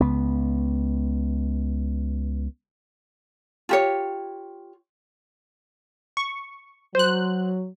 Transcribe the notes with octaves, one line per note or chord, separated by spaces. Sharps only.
C#2 B3
F4 G4 C#5
C#6
F#3 C5 F#6